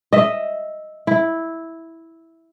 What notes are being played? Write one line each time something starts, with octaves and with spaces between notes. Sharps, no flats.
D#5 E5
E4